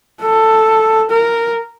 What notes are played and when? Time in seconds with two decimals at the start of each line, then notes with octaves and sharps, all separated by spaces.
0.21 A4
1.10 A#4